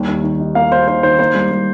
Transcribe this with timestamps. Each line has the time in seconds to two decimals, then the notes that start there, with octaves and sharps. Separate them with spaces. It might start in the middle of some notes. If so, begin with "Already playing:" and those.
Already playing: D#2 G3
0.08 D#3
0.24 D#3
0.40 D#4
0.55 A#3 F5
0.71 A#3 C5
0.88 D#4 C5
1.03 D#3 C5
1.19 A#3 C5
1.35 G3
1.51 G3